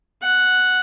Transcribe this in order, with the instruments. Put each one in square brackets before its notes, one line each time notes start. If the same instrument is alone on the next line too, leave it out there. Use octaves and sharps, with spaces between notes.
[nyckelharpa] F#5